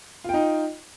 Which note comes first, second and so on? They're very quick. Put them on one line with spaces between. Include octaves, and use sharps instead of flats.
F4 G5 D#4